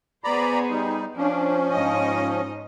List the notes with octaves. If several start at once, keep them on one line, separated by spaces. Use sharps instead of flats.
B3 G#4 C5 D5 A#5 B5
G3 D#4
F3 C#4 D4
G#2 D#4 D#5